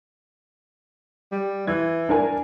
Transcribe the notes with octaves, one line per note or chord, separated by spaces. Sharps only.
G3
E3 G#6
D4 A#4 G#5